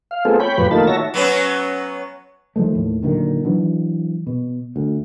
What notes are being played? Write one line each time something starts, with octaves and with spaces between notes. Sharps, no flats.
F5
A3 B3 C4 F4 G#4 A4
C#5 G5 B5
F2 A2 F3 G4 B4 B5
D#3 A3 A#3 D#4 F4 A5
F#4 C#5 E5 A5 A#6
F#3 B3 C#4
D#3 F3 G#3 A3
D#2 A2
A#2 D3 D#3 F#3
E3 F#3 D4
B2
D2